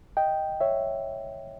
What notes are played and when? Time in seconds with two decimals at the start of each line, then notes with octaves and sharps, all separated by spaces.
0.17 D#5 G5
0.60 C#5 E5